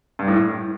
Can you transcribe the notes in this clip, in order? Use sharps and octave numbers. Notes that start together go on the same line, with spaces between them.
G2
A2